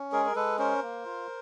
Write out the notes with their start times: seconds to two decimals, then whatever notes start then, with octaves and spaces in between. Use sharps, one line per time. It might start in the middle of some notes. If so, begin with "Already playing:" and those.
Already playing: C#4
0.12 G#3 G#4 A#4
0.26 A#4
0.36 G#3 A4 B4
0.59 C#4 A#4 C5
0.82 A#3
1.05 F4